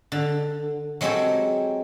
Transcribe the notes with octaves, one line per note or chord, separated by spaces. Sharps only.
D3
F#3 G#3 C4 G4 A4 C#5